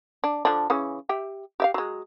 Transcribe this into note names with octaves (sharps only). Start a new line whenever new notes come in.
D4
D3 F3 D4
C#3 E3 C#4
G4 E5 G5
G4 E5 F5
F#3 G#3